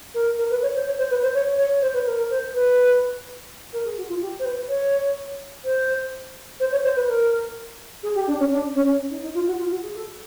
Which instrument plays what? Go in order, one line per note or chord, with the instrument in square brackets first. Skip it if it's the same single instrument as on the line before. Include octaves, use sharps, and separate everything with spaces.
[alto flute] A#4
A#4
B4
C#5
C5
C#5
C5
B4
C5
C#5
C#5
C5
B4
A#4
A#4
C5
B4
A#4
G#4
F#4
F4
G4
C5
B4
C#5
C5
C5
C#5
C5
B4
A#4
G#4
G4
D4
C#4
D4
C#4
D#4
D#4
F4
F#4
F4
F#4
G#4
A4